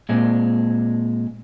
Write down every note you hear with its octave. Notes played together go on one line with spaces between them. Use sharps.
A#2 G#3 C4